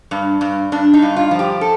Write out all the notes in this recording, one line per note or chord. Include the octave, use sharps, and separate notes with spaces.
G2
G2
G2 D4
D#4
G2
F4
F3
G4
A4